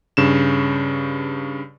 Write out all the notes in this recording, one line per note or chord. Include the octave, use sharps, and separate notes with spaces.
G2 C#3 E7